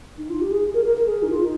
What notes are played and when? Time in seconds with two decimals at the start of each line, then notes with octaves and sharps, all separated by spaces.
0.18 D#4
0.30 F4
0.41 G4
0.52 G#4
0.74 A#4
0.85 A#4
0.97 A#4
1.08 G#4
1.23 D#4
1.30 F4
1.42 D#4